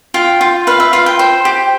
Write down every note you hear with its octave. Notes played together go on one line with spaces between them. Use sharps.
F4 G5
F4
B4 F5
E5
F4 F5
G5
C5
G4